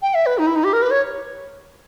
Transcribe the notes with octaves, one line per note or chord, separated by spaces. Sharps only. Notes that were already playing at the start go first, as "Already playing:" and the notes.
G5
E5
B4
D#4
E4
D#4
G4
A#4
B4
C#5